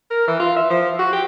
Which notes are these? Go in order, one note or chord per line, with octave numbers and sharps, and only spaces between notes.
A#4
E3
F4
E5
F3
F#4
G4